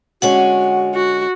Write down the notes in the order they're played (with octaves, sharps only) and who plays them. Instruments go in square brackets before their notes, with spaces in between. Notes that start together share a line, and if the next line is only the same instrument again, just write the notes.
[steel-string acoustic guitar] D3 G#3 C#4 [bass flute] F#4 [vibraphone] F#5
[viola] F#4